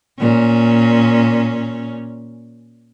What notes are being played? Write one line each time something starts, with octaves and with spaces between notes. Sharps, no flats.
A#2 C#4